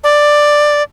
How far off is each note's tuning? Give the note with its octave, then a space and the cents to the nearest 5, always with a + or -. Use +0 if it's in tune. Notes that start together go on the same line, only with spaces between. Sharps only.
D5 +10